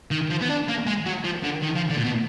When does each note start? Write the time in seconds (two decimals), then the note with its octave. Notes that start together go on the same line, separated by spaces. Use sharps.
0.11 D#3
0.30 F3
0.41 B3
0.49 D4
0.68 A#3
0.87 G#3
1.06 F#3
1.24 F3
1.43 D3
1.62 D#3
1.76 F3
1.91 D3
1.98 A#2
2.05 B2